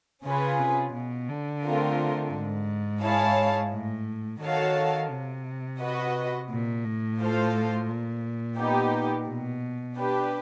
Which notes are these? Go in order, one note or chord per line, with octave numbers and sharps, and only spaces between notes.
C#3 C#4 F4 G#4 B4
C3
B2
D3
A3 C4 F4 A#4
G#2
E4 G#4 C#5 F5 A5
A2
D#3 F#4 A4 C#5 F5 A5
C3
F#4 B4 D#5
A#2
A2
F4 A4 C5 F5
A#2
B3 D#4 G4
B2
D4 G4 B4